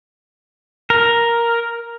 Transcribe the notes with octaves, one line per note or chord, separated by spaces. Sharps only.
A#4